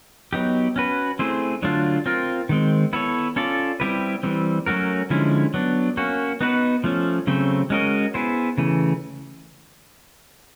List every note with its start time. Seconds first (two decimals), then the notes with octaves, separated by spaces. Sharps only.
0.33 F#3 B3 D#4 G4
0.76 C#4 F#4 B4
1.19 A3 C4 E4 G#4 C5
1.62 D3 F#3 A3 D4 F4
2.06 C4 F4 A#4
2.49 D#3 G#3 C4
2.93 B3 E4 A4 C#5
3.36 C#4 F4 A4 D5
3.80 G3 C4 E4 G4 B4
4.23 E3 G3 C4
4.66 F#3 A3 C#4 F#4 A#4
5.10 D3 F3 G#3 C#4 E4
5.54 F#3 B3 D4
5.97 A#3 C#4 F#4
6.41 B3 D#4 F#4 B4
6.84 F3 A3 C#4
7.27 C#3 F#3 A3 C4
7.70 G#3 C#4 F#4 A#4 D#5
8.14 B3 E4 G#4 C5
8.58 C#3 E3 A3